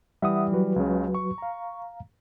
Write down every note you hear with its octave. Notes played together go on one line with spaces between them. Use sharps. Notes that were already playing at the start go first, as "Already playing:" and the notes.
E3 G3 E5 F#5 D#6
F#3 F#4 B4
C#2 C#3
C#6
F5 A#5